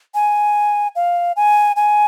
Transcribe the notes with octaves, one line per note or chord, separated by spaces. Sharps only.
G#5
F5
G#5
G#5